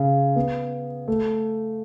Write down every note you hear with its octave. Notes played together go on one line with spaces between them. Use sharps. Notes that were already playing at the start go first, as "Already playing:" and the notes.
Already playing: C#3
B3
A3